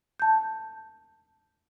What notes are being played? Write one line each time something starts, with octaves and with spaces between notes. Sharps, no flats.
A5 G6